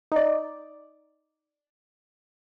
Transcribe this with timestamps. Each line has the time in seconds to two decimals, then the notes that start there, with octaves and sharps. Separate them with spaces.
0.12 D#4 D5